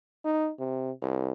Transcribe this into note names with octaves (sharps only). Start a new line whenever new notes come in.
D#4
C3
C2